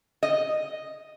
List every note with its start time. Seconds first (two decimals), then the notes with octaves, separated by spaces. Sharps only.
0.23 D#5